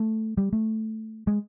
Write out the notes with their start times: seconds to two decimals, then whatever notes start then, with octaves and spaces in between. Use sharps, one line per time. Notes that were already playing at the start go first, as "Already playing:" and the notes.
Already playing: A3
0.37 G3
0.53 A3
1.27 G#3